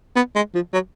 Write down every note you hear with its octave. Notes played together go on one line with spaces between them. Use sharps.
B3
G#3
F3
F#3